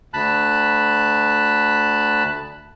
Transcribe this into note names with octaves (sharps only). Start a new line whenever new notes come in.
D2 A5 B5 F#6